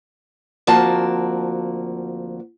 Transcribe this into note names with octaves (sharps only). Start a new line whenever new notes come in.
D2 F3 A#3 C4 F#4 A5